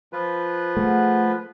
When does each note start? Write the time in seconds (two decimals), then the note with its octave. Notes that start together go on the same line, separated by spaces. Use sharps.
0.13 F3 F4 B4
0.77 A3 G#4 F#5